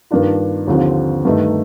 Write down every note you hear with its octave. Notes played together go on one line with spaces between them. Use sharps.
G2 D#3 A#3 D4 F4
D#2 D3 F3 C4
G2 D#3 A3 D#4